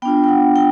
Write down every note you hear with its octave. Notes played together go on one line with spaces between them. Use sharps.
B3 D4 F4 G5
G5
F#5
G5